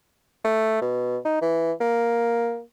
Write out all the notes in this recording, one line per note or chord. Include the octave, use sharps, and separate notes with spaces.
A3
B2
D#4
E3
A#3